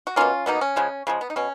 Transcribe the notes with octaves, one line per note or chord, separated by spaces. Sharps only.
F#4
B2 A#3 C#4 F4
B2 A#3 B3 D#4
C#4
C#3 F3 G#3
C#3 F3 G#3
B3
D#4
B2 C#4